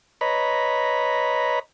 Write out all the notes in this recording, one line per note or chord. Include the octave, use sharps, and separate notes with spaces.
B4 C#5 D#5 A#5 B5